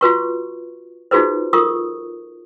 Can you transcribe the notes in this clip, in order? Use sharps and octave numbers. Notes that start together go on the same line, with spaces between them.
F4 F#4 B4 C#6
D#4 F4 F#4 G#4 B4 C5
F4 A4 A#4 C#6 D#6